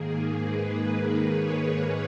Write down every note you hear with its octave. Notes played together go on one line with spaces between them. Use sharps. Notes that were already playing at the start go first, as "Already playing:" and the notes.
Already playing: G#2 D#3 A#3 G#4
B4
C#5